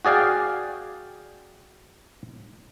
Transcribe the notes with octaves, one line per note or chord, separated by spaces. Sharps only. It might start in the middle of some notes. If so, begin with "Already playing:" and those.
F#4 G#4 D5 F5 G5